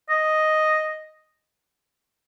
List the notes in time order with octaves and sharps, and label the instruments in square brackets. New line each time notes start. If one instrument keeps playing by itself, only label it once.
[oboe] D#5